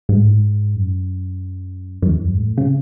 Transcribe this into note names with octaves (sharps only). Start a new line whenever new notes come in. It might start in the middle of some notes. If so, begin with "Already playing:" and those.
G#2
A2
G#2
F#2
F#2
E2
F#2
G#2
A2
C#3